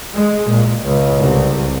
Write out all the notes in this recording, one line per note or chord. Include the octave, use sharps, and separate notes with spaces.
G#3
A#2
C#2
C2